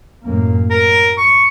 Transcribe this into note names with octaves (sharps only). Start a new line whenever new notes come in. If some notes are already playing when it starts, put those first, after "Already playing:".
F#2 A2 A#3
F#3 A#4
C#6